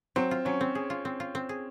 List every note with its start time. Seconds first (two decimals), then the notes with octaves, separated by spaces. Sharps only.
0.16 F#3 C4
0.31 F4
0.45 F#3 C#4
0.61 C4
0.75 G#4
0.90 F4
1.05 C4
1.20 F4
1.35 C4
1.49 G#4